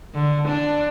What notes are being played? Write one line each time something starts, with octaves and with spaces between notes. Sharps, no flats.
D3
D4